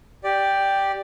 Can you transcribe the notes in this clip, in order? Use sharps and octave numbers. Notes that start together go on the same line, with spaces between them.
G4 D5